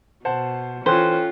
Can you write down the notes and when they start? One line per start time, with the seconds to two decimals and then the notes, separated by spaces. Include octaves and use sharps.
0.25 B2 C5 F#5 A5
0.86 E3 C#4 F4 A4 C5 G5 F#6